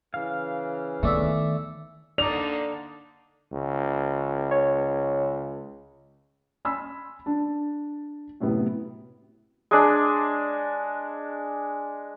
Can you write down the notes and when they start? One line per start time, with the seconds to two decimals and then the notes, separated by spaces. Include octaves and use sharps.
0.14 C#3 E3 F5
1.03 D#3 A3 B3 D5 E5
2.18 D3 A#3 D#4 D5 F7
3.52 C#2
4.51 C#5
6.65 G#5 B5 C6 E6
7.26 D4 A5
8.40 F#2 A2 C3 B3
9.71 G#3 D4